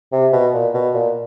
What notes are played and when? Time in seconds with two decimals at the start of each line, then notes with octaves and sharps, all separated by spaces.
0.12 C3
0.33 B2
0.53 A#2
0.74 B2
0.94 A#2